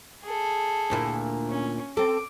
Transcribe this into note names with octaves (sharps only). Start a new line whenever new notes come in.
G#4 A4
D2 A#2 E4
C#4
C4 A4 D6